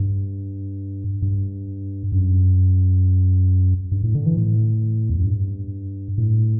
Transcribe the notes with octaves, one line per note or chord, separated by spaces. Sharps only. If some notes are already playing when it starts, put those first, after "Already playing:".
Already playing: G2
G2
F#2
G2
A2
D3
E3
A2
E2
F#2
G2
A2